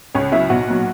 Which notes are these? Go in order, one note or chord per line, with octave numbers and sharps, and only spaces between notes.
C#2 C#4 C#5
C#3 F#3 E4 E5
B1 F#4 F#5
A#2 F#3